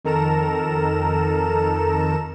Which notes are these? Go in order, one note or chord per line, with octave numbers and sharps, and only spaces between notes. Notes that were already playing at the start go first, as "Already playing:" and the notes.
F2 D#3 A4 A#4 A#5 E7